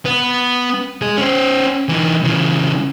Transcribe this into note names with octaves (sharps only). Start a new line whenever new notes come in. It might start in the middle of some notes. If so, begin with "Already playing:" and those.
B3
G#3 G#4
C#4 C5
E3 D#4
C#3 E3